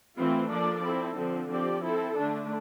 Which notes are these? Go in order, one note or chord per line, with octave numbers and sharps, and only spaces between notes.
E3 A3 C4 F4
F3 A#3 D4 A4 D5
C4 E4 A4
D3 F3 C4
F3 C4 G4 D5
C4 E4 A4
D3 A3 D4